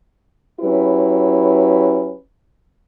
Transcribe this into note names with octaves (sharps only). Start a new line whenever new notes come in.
F#3 C#4 E4 G4 B4